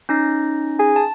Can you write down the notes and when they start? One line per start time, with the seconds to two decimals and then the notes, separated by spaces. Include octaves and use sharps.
0.09 C#4 D#4 A#6
0.79 G#4
0.96 A5